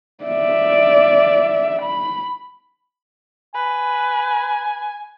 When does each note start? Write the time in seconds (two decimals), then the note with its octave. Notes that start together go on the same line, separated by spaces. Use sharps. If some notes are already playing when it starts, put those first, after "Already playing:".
0.24 D5 E5
1.82 B5
3.54 B4 G#5